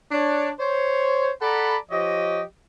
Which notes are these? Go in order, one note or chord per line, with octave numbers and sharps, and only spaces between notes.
D4 C#5
C5 C#5
A4 D5 F#5 A#5 B5
F3 G4 C#5 D#5